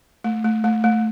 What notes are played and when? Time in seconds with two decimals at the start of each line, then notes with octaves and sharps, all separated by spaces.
0.24 A3
0.44 A3
0.64 A3
0.84 A3